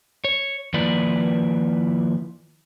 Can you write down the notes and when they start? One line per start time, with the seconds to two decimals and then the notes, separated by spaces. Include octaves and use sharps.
0.25 C#5
0.74 D#3 F3 A#3 E4 B4 D5